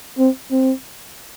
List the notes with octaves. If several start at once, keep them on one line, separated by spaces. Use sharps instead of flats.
C4
C4